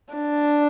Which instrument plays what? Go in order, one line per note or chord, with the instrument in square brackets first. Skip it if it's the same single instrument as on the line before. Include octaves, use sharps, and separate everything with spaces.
[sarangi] D4